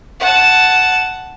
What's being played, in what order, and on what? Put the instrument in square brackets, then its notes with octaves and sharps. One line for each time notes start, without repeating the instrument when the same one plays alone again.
[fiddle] F#5 A5